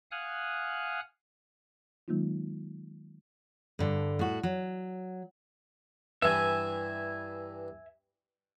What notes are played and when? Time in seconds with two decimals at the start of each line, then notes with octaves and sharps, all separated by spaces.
0.11 F5 F#5 G#5 D#6 F6 F#6
2.08 D#3 F#3 G#3 A#3 D#4 F4
3.79 G2 D3
4.19 A2 F#4
4.43 F#3
6.22 G2 E3 E5 G#5